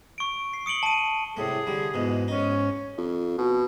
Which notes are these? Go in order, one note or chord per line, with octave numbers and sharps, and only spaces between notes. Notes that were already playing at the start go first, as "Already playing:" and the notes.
C#6 D7
C7
D#6 C#7 D7 F#7 G7
A5 D#7
C2 A2 A3 G#4
D3 G3
E2 G#2 B2
G#2 C#4 D#4
F2
B2